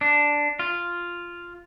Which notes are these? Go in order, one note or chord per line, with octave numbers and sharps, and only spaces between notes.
D4
F4